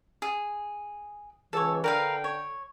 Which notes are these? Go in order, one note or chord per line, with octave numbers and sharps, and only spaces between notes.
G#4
C#2 E3 A4 C#5
D3 A#4 B4 F5 G5
C#5